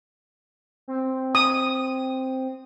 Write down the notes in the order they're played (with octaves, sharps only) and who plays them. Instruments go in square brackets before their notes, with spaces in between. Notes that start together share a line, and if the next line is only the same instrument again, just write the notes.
[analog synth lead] C4
[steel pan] D#6